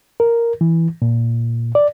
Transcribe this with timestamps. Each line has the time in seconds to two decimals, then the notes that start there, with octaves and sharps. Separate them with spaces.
0.20 A#4
0.61 E3
1.02 A#2
1.75 D5